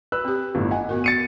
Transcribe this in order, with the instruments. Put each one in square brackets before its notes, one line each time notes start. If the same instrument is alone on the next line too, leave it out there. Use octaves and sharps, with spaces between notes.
[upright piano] B4 E6 F#6
[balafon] C4 G4
[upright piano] G1 A2
[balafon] D#5 [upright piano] F#5 G#5
[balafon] B3 F#4 A#4
[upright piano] A6 C#7 D#7